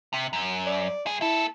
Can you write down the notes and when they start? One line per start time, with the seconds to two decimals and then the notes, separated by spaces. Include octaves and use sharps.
0.13 C3
0.33 F#2
0.66 D5
1.06 G2 G#4
1.22 A#3 E4 A4